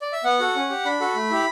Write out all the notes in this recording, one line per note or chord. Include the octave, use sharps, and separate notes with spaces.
D5
E5
B3 F#5
F#4 A4
C#4
G4
D4 B5
F#4 A4
A3
E4 G4